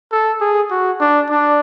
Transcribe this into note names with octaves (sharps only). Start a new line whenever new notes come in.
A4
G#4
F#4
D4
D4